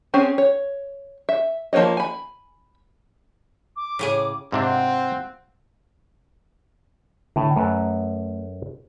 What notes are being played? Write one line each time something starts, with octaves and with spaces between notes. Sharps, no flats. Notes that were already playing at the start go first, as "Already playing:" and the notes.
C4 C#4 G#4 C5
C#5
E5
F3 A#3 B4 C#5 D#5
G#5 B5
D6
A2 C#3 G#4
G#2 C3 C4 D4 F4 F#5
A2 D3
F#2 A3 A4 B4